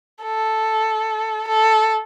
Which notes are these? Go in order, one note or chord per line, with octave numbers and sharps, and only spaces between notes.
A4
A4